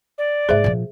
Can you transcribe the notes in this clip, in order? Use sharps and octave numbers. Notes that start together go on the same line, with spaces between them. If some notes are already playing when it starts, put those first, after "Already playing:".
D5
G#2 A#3 G#4 C5 E5
A#2 F3